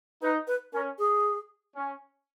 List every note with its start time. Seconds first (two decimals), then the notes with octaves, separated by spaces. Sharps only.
0.22 D#4 B4
0.47 B4
0.73 C#4 A#4
0.99 G#4
1.76 C#4